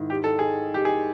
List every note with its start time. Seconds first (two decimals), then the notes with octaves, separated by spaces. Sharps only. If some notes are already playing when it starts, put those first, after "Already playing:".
Already playing: G#2 D#3 E4
0.10 G4
0.24 A4
0.39 G#4
0.74 G4
0.85 G#4